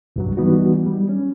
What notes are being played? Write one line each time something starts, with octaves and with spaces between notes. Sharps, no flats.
C2 G2 F#3
E3 G3 B3 D#4 F#4
G3
C#4